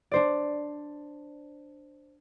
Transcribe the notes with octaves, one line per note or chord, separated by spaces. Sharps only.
D4 C5 D5